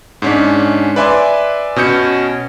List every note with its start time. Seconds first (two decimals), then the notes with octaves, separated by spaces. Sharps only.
0.22 G#2 C#4 D4
0.96 B4 D5 E5 G#5 C6 D6
1.76 B2 C#4 G6 C#7